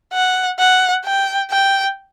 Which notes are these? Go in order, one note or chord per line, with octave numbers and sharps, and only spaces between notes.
F#5
F#5
G5
G5